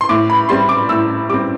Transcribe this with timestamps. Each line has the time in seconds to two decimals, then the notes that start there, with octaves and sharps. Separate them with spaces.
0.01 C6
0.09 A2 D6
0.30 B5
0.49 G3 C4 C6
0.69 D6
0.89 A2 E6
1.29 G3 C4 D6